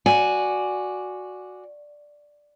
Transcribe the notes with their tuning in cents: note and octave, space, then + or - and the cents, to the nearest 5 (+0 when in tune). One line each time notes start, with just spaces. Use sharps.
F#4 -10 D5 +0 G#5 +0